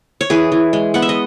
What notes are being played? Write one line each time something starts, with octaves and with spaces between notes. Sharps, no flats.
C#5
E3 G#4 B4
E3
G#3
B3 F#5
E5
D#5